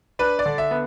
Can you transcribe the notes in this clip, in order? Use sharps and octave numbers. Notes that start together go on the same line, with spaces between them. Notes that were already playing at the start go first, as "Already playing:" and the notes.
D4 B4
D5
D3
E5
B3